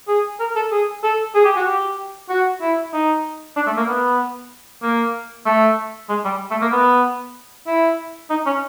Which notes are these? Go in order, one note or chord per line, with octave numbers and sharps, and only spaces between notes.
G#4
A#4
A4
G#4
A4
G#4
G4
F#4
G4
F#4
E4
D#4
D4
A3
A#3
B3
A#3
A3
G#3
G3
A3
A#3
B3
E4
D#4
C#4